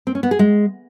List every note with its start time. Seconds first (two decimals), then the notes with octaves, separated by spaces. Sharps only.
0.07 C4
0.15 C#4
0.23 B3
0.31 G#4
0.39 G#3